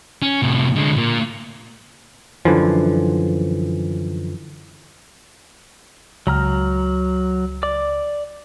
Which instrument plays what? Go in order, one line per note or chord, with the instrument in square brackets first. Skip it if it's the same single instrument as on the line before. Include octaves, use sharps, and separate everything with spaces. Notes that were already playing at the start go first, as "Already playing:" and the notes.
[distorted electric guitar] C#4
A2 C3
D3 G#3
A#2 A#3
[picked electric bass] F#2 D3 E3 F3
[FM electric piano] C#2 [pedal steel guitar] F#3 A#5 F6
[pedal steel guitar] D5 D6